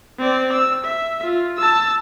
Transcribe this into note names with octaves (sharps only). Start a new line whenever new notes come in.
C4 D5
E6
E5
F4
A5 E6